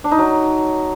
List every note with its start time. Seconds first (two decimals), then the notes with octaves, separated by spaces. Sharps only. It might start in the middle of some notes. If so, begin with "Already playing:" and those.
0.04 D4
0.11 D#4
0.19 F#3